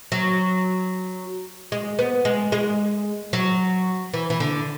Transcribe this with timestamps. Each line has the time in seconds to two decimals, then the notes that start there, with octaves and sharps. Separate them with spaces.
0.12 F#3
1.72 G#3
1.99 B3
2.25 G#3
2.52 G#3
3.33 F#3
4.14 E3
4.30 E3
4.40 D3